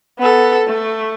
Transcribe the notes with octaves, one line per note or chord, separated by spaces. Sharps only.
B3 A4
A3